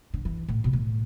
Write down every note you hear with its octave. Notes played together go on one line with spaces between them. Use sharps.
D3
E3
A2
B2
A2